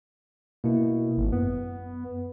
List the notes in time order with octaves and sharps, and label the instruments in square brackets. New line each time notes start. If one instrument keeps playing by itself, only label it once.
[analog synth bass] B2 [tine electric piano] A#3 E4
[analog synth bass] G#1
[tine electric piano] F#2 [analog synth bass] B3